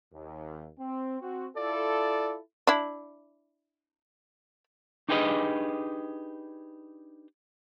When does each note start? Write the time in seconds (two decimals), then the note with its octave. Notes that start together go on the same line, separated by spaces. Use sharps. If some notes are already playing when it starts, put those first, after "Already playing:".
0.14 D#2
0.79 C4
1.21 C4 F#4
1.57 E4 F4 A4 D5
2.67 D4 E4
5.09 D4 D#4 G4 G#4 B4 D#5